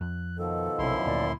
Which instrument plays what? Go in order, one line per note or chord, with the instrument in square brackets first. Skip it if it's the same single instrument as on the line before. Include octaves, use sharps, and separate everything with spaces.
[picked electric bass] F2 [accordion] F#6
[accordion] B2 D#3 F3 [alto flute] A4
[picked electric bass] B1 C3 [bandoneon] F#2 E4 C6
[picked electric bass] D2 A#2 [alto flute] D5